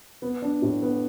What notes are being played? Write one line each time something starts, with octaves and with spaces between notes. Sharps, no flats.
B3
D4
A2
B3